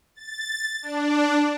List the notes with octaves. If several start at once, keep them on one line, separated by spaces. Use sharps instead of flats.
A6
D4